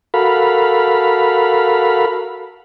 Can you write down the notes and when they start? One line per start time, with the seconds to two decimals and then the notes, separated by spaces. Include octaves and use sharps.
0.14 F#4 A4 A#4 F5 B5